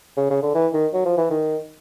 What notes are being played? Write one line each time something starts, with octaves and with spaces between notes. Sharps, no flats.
C#3
C#3
D3
E3
D#3
F#3
F3
E3
D#3